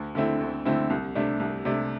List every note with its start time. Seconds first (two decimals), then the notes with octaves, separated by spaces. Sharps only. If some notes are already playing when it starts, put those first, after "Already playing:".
Already playing: D2
0.15 D3 A3 C4 E4
0.40 D2
0.65 D3 A3 C4 E4
0.90 C2
1.15 C3 A3 D4
1.40 C2
1.65 C3 A3 D4